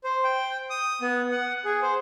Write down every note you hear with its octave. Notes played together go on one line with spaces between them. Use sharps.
C5
G5
D#6
B3
F#5
G#4
C5